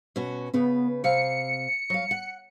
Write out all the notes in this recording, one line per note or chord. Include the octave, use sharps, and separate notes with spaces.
B2 C#4 F#4
C#3 B3 B4
C3 F5 C#7
F#3 F5
F#5